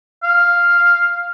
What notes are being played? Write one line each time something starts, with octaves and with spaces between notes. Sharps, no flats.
F5